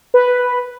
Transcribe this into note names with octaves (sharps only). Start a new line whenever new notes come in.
B4